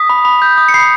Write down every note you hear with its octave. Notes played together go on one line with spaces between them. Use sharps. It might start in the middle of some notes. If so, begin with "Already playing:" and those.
Already playing: D#6 B6
B5
B5
G6
D#6
C#7
B5 C7